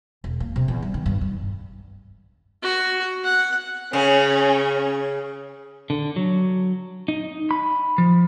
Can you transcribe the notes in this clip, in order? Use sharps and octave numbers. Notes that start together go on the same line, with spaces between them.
E1
A#3
C3
E2
G3
D#3
G2
G2
F#4
F#5
C#3 C#4
D3
F#3
D#4
B5
F3